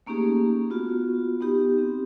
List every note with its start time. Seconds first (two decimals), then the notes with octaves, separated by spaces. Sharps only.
0.06 A3 A#3 C#4 D#4 G4 G#4
0.70 B3 F4 F#4
1.41 B3 D#4 G4
1.78 C4